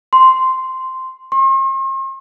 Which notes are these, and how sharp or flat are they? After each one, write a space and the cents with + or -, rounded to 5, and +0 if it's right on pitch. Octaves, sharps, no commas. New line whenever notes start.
C6 -5
C6 +45